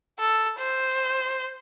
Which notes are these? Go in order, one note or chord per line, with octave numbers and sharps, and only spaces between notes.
A4
C5